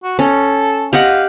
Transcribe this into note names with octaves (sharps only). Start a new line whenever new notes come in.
F#4
C#4 A4
G4 D#5 F5 F#5